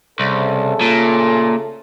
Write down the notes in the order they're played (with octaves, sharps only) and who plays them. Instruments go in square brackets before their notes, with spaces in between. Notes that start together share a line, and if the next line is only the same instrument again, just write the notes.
[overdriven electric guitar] C2 [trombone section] C#3 A3 A4
[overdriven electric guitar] A#2